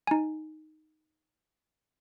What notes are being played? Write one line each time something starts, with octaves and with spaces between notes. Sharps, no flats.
D#4 G#5